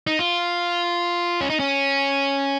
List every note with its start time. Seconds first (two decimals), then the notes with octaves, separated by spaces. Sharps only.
0.07 D#4
0.19 F4
1.41 C#4
1.50 D#4
1.60 C#4